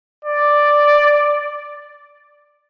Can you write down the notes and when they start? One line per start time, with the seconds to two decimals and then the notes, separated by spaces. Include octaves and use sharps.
0.25 D5